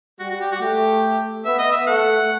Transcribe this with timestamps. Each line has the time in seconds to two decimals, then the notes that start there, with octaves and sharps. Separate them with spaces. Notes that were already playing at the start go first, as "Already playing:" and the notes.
0.19 G3 F#4
0.30 F#4
0.41 G4
0.52 F#4
0.61 A3 G4
1.45 B3 E5
1.59 D#5
1.72 E5
1.87 A3 F#5